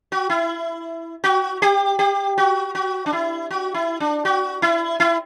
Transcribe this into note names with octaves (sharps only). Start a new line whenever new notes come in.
F#4
E4
F#4
G4
G4
F#4
F#4
D4
E4
F#4
E4
D4
F#4
E4
E4